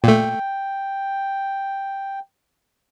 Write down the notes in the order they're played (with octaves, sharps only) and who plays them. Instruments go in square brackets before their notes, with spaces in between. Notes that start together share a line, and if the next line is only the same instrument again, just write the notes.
[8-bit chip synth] A#2 A3 [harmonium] G5